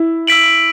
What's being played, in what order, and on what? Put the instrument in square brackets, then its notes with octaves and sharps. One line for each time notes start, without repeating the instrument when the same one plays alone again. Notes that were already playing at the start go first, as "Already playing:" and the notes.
Already playing: [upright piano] E4
[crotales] E6 B6 D7 F#7